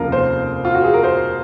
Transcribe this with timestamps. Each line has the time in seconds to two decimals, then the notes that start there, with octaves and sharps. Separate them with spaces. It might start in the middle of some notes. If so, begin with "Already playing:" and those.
Already playing: F1 D#2 C#3 F3 F4 A#4
0.12 C5
0.65 F4
0.75 F#4
0.84 G#4
0.94 A#4
1.04 C5